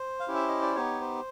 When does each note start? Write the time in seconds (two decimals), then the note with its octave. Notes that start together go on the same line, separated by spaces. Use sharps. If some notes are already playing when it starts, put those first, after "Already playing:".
Already playing: C5
0.20 F5
0.28 C#4 E4 G4
0.35 E5
0.48 D#5
0.62 D5
0.75 B3 D#4 G4 C#5
1.01 C5